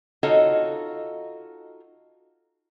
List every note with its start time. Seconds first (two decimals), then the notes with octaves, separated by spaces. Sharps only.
0.23 D#4 F4 F#4 A4 C#5 D#5